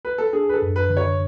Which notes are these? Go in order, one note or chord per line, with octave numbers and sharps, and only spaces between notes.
B4
A4
D4 G#4
B4
A4
F#2
B4
D3
C#5